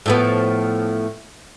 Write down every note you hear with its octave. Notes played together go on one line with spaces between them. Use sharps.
A2 F3 B3